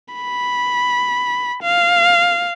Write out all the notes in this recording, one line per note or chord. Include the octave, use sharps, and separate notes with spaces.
B5
F5